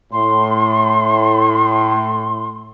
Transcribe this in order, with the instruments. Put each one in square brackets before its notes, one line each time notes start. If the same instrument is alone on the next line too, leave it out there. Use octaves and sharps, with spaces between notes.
[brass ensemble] A2 [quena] C6